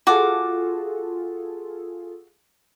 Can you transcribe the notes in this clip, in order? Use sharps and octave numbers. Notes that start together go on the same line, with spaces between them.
F4 F#4 G#4 A4 D6